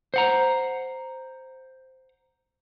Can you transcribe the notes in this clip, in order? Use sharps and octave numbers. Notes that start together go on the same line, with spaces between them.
C5 F#5 A#5